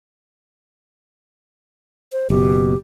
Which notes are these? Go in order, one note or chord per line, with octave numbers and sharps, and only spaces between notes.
C5
F#1 B2 G4